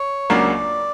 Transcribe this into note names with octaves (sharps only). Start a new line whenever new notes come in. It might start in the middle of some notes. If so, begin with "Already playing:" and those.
Already playing: C#5
C#2 C#3 F#3 A#3 D4 D5